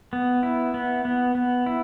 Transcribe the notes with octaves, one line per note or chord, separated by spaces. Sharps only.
B3
E4
B3
B3
B3
E4